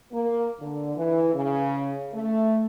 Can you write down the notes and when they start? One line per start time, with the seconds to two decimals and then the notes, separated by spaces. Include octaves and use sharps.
0.12 A#3
0.60 D3
0.96 E3
1.34 C#3
2.13 A3